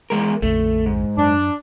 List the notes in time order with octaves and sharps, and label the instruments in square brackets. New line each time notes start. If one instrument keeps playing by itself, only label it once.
[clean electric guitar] E2 G#3 A#4
[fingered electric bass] A#1 F2 D3 [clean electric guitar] A3
[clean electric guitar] G#2
[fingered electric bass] F#2 [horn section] D4